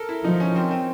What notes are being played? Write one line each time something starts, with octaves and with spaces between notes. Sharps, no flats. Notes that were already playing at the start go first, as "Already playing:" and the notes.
Already playing: A4 A#4
E4
F3 D#4
C#4
C4
C4